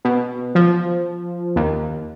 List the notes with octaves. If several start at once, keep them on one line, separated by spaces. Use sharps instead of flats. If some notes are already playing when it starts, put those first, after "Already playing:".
B2
F3
D#2